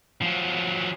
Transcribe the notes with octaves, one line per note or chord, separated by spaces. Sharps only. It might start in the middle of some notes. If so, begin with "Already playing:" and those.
F3 F#3